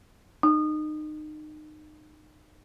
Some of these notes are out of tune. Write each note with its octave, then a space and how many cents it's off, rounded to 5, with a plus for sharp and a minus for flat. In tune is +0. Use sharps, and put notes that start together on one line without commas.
D#4 -30